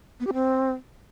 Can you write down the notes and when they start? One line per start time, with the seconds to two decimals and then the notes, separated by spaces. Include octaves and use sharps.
0.20 B3
0.27 G4
0.34 C4